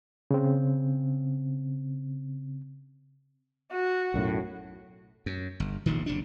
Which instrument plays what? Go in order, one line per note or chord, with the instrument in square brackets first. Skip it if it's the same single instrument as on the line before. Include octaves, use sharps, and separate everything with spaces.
[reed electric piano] C#3 C4
[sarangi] F#4
[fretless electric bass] B1 F#2 A2
[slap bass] F#2
G1
E1 A#1 A2 D#3
F#1 C3 D4